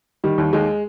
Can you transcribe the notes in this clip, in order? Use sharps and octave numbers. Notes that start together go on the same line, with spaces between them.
D#3 G3
D#2
D#2 G#3